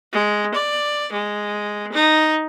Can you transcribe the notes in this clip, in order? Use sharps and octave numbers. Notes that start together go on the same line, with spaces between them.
G#3
D5
G#3
D#4